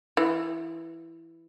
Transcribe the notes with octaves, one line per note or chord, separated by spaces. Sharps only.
E3